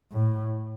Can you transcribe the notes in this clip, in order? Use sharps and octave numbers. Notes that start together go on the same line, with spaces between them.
A2